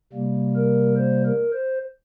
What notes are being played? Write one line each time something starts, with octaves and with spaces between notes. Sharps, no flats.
C3 G3 A#3
A#4
C5
A#4
C5